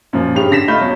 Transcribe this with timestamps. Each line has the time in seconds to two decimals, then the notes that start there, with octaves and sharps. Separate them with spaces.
0.13 F#2 A#2 F3
0.36 G2 C#4 G4 G#4 F7
0.51 D3 A#6 B6 E7
0.68 A3 F4 D#5 B5 G6
0.80 E2 F#3